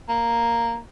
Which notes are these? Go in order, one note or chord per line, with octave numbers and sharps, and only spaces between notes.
A#3